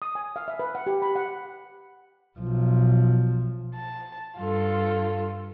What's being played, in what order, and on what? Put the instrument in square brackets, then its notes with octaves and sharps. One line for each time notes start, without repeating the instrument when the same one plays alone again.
[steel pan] D#6
G#5
F5
E5
B4
F#5
G4
B5
F#5
[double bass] B1 F3
[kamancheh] A5
[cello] G2 [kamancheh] F4 A4